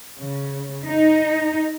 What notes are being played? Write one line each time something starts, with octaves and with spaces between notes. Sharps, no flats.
C#3
D#4